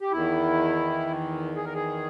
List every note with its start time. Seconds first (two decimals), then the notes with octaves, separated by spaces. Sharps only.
0.01 G4
0.12 E2 D#3 E4
1.56 G#4
1.65 A#4
1.74 G#4